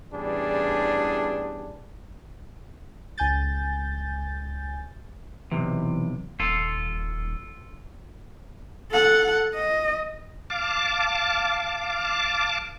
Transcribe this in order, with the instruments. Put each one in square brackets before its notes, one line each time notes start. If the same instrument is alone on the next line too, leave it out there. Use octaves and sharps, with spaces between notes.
[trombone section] A1 E2 G3 D4 G#4
[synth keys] C#2 G#5 G6 A6
[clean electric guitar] B1 G#2 C3 [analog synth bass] E3
[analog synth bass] D#1 [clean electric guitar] F4 A4
[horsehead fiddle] A4 F#5
D#5
[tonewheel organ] F5 A5 D6